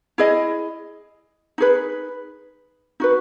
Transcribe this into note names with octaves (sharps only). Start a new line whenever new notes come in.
E4 G#4 D#5
D#4 G#4 B4
D#4 F#4 B4